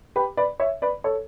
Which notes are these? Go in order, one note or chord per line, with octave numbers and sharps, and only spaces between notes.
G4 B4
B4 D5
C#5 E5
B4 D5
A4 C#5